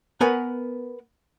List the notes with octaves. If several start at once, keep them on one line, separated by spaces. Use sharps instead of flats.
B3 A#4 B4 C#5 F#5 G#5